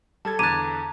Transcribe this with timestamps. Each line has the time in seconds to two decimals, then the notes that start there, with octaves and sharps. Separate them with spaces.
0.25 G3 A4 A5 G#6
0.39 E2 D3 A#5 D6 F#6 G#6 A6 D#7